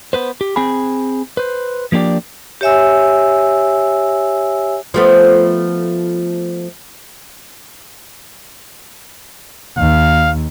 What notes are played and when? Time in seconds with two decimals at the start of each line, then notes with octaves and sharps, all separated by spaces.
0.13 B3 B4 C5
0.41 G4
0.56 C4 G#4 G#5 B5
1.37 B4 C5
1.92 F3 A#3 D4 G4 D5
2.61 G4 C#5 E5 G#5 E6
4.94 F3 A3 B3
9.78 D#2 F5